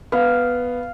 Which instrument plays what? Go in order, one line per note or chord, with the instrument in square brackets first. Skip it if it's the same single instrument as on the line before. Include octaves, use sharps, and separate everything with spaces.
[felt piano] B3 [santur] F5